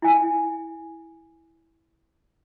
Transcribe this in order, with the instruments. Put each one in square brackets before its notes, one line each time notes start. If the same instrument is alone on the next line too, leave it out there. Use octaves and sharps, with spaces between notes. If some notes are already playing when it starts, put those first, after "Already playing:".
[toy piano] E4 G#5